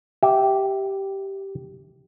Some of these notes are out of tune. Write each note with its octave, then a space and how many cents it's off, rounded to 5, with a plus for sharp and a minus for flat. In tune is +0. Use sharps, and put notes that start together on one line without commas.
G4 -10 E5 -10